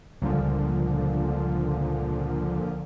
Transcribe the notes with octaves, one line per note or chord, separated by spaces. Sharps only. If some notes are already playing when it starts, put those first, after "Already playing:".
C#2 A#2 D3 F3 G3